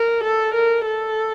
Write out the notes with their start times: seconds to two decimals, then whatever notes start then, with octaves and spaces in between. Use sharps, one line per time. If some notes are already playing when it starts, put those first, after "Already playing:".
Already playing: A#4
0.23 A4
0.54 A#4
0.86 A4